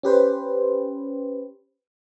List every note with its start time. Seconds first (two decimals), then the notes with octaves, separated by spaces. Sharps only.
0.03 C#4 G4 B4 C5